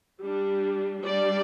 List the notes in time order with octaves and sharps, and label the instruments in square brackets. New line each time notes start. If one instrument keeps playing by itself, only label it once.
[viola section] G3 D4
G3 D4 D5